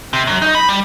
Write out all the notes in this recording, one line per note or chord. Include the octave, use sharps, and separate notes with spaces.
C3
F#2
D#4
B5
G3